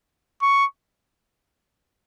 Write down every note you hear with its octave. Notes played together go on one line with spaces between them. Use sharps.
C#6